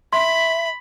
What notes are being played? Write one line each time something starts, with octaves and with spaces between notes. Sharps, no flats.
E5 B5 C6